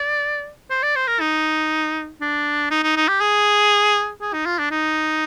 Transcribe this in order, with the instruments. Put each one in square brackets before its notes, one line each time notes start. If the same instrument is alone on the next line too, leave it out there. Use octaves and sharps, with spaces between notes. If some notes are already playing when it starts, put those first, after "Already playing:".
Already playing: [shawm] D5
C5
D5
C5
A#4
D#4
D4
D#4
D#4
D#4
G4
G#4
G#4
D#4
F4
D4
D#4